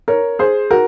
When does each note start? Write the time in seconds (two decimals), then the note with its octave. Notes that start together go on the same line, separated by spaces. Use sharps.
0.08 A#4 C#5
0.39 G#4 C5
0.71 F#4 A#4